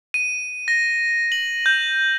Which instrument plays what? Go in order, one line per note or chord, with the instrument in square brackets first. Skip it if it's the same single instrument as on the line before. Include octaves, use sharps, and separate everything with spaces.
[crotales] D#7
A#6
F#7
G6